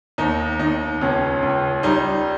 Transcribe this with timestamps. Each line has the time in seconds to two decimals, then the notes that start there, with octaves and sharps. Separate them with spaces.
0.18 D#2 D#4
0.59 D#2 D#4
1.01 C#2 C#4
1.42 C#2
1.83 G3 D#4